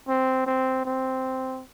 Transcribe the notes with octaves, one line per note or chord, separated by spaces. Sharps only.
C4
C4
C4